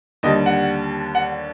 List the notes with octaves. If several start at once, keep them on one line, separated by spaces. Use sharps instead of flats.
D#2 D3 G3 D#5
F#5
F#5